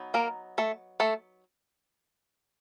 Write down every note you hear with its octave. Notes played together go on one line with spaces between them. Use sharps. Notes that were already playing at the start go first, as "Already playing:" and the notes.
Already playing: F#3 B3 D#4
A#3 A#4
A3 A4
A3 A4